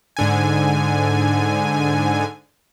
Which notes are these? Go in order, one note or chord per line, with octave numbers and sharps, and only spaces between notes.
G#2 D3 G#5